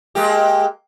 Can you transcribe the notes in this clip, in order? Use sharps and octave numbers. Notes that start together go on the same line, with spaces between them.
G#3 A#3 G4